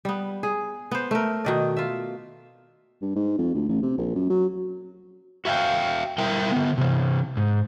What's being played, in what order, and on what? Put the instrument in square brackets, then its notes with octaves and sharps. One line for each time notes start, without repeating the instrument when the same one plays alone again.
[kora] G3 B3
G#4
B3 C5
A3 A#4
B2 D#3 D5
F4 E5
[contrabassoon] G2
G#2
F2
D2
A1
C3
A#1
F#2
F#3
[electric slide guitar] F#4 E5 F5 G5
G3 E4 A#4 E5 G5
D3 B3
C3 E3
G#2